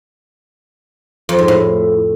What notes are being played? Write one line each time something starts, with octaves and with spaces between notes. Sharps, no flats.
F2
G#2
A2